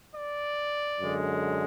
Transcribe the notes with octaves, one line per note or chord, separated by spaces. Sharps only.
D5
F#2 D3 G#3